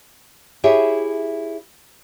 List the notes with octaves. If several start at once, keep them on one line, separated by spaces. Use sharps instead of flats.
E4 G4 G#4 C#5 E5